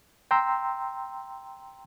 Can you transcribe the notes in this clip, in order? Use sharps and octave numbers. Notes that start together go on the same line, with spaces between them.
G5 A#5 C6 E6